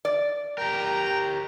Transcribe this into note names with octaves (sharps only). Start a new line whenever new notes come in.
D5
G4 A#4 G5 A#5